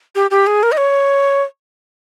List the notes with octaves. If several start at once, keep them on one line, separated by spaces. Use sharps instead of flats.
G4
G4
G#4
A#4
D#5
C#5